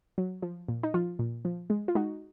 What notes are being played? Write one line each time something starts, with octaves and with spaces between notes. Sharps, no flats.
F#3
F3
A#2
D#4
F3 F4
A#2
F3
G#3
F4
G#3 D#4 F#4